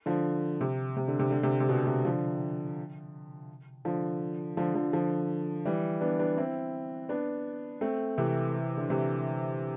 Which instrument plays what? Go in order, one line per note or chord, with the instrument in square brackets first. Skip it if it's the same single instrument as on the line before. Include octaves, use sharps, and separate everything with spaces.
[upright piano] D3 F3
C3
C3
D3
C3
D3
C3
C3
B2 D3
C3
D3 F3
D3 F3
D3 F3
D3 F3
D3 F3
E3 G3
B3 D4
B3 D4
C4 E4
B3 D4
A3 C4
C3 E3
D3
C3 E3